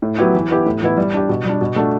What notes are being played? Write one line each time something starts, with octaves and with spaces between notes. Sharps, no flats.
A2
F#3 B3 E4 G4
E3
B3 E4 G4
A2
E3 B3 E4
G3
D4 G4
B2
G3 D4
B2
A3 D4 F#4